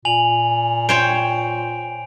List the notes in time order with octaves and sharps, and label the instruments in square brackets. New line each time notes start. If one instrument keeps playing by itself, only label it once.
[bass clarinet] A#2 [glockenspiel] G#5 F7 F#7
[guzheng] C5 C#5 G5 [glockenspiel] D7